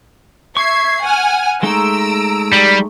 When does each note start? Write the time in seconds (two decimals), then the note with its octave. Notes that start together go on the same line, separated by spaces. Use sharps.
0.57 E5 C#6 G#6 C7
1.02 F#5 G#5 F6
1.63 G#3 A3 D#4 A#5 E6 D7
2.53 G3